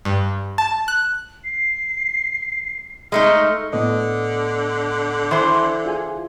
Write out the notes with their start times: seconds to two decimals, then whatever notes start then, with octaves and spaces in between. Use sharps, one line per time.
0.05 G2
0.58 A5
0.88 F#6
1.44 C7
3.12 G#3 A3 D#4 F6
3.73 A2 D3 B3 D#5
5.31 E3 C5 C6
5.86 F4 G#4 G#5